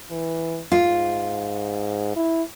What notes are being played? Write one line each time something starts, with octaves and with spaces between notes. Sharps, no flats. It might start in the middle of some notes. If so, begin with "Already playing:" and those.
E3
G#2 F4
E4